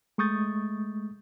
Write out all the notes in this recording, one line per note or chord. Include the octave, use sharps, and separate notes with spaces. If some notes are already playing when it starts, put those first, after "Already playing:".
G#3 A3 C#6 D#6 G6 A6